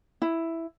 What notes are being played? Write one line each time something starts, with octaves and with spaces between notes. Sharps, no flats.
E4